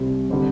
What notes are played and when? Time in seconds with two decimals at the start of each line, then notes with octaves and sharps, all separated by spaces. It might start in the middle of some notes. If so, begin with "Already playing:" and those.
Already playing: C2 C3 G3 C4
0.30 D3 G3 C4